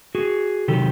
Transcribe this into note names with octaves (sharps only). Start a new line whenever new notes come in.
F#4 G#4
C3 D#3 F#3 G4 A4